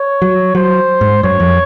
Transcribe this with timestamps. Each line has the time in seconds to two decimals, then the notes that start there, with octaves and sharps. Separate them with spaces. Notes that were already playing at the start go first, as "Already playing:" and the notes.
Already playing: C#5
0.22 F#3
0.55 F#3 C5
1.01 G#2
1.23 F#2 C#5
1.40 F2